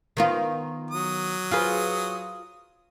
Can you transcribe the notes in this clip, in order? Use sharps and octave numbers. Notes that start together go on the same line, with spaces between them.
D#3 B3 F4
F#3 D#6
F4 G#4 B4